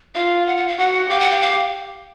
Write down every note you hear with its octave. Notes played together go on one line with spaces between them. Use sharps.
F4 F5
F#5
F#5
F5
F#4 F#5
G4 F5
F#5
F5
F5